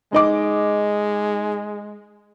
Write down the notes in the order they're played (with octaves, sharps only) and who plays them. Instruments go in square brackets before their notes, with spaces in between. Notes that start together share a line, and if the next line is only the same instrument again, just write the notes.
[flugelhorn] G#3 [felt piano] D#4 D#5 D6